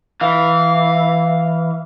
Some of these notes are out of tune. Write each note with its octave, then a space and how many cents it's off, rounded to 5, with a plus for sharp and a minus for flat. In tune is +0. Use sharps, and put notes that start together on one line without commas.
E3 +0 F5 +0